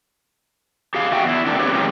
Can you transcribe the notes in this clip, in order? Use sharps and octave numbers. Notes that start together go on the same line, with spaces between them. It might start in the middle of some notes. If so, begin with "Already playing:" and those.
G4 G#4 F5
F#4 E5 F#5 G5
E2 E4
A3 A#3 C4 D4
G4 B4 C#5
D#3 G#3 C4 C#4 D#4